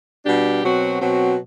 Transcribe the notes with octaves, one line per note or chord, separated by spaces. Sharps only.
B2 G3 D4 G4
B2 F#3 C4 F#4
B2 F#3 C4 F#4